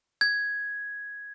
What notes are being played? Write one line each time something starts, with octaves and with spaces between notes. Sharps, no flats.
G#6